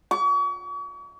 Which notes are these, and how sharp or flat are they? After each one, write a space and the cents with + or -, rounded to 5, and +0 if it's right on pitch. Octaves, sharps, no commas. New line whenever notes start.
C#6 +40